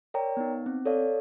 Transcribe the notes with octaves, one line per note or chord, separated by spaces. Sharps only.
A#4 C#5 D5 G5 A#5
B3 D#4
C4
A4 C#5 D5 F5